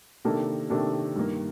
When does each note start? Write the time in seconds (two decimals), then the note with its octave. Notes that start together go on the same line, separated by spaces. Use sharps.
0.25 C3 D#3 A#3 D4 A4
0.70 C3 D#3 A#3 D4 A4
1.16 G2 D#3 A#3